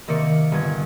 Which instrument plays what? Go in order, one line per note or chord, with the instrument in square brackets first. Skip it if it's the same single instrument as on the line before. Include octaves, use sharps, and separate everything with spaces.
[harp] C3 D#3 A#3 D5 C#7
G1 G#6